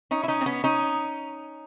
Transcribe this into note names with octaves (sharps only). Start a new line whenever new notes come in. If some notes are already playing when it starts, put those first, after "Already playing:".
C#4 D#4
E4
C#4 D#4
C4
B3 C#4
C#4 D#4